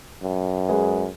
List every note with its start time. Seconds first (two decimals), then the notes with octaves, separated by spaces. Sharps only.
0.23 F#2
0.69 G#3 G#4 B4